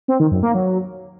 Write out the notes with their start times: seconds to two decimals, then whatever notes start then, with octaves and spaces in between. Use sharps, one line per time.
0.08 C4
0.20 D#3
0.31 F#2
0.43 A#3
0.54 F#3